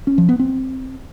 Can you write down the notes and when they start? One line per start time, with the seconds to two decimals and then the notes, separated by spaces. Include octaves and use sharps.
0.07 C#4
0.18 F3
0.29 B3
0.39 C4